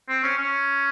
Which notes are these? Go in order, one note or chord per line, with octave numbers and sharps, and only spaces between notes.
C4
C#4
C#4